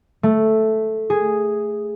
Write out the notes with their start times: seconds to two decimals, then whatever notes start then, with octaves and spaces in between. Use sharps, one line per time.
0.23 A3
1.10 G#4